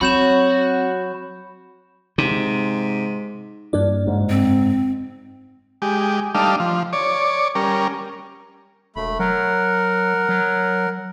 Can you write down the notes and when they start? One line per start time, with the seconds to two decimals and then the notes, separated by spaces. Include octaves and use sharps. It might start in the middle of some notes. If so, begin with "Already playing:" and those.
0.01 F#3 C4 F#4 B5 G6 E7
2.18 G#2 C3
3.73 G2 A#3 D4 D5
4.06 F#1 G#2
4.30 C4
5.82 G#3 G4
6.35 G3 A3 D4 D#4 F5
6.60 F3
6.93 C#5 D5
7.55 G3 C#4 A#4
8.96 E1 A3 B5
9.19 F#3 A#4 F#5
10.29 F#3